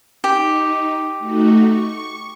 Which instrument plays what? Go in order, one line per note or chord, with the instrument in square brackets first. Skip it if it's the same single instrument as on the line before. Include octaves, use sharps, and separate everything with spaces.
[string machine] D#4 [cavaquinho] G4
[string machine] A3 D#4 F#4
C#6